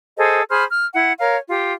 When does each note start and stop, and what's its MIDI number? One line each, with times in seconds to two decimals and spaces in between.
0.17 0.41 68
0.17 0.41 69
0.17 0.41 72
0.17 0.41 75
0.49 0.64 68
0.49 0.64 72
0.49 0.64 83
0.49 0.64 89
0.71 0.85 89
0.94 1.12 64
0.94 1.12 78
1.19 1.37 70
1.19 1.37 73
1.19 1.37 77
1.48 1.71 65
1.48 1.71 67